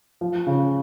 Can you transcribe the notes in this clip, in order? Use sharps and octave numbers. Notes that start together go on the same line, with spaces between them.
F3
C#3